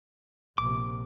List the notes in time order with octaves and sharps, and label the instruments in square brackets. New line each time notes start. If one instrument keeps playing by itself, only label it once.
[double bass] A#1 C3 [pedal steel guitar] D6